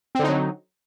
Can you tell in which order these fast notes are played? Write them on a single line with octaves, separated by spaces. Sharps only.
C4 D3 D#4 F#3